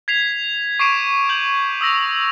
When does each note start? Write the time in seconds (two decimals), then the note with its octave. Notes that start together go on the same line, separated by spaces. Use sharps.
0.08 G#6 B6 C7 F7
0.79 C#6 D6 C7 D7 E7
1.29 G6 F#7
1.81 D#6 E6 A#6 F7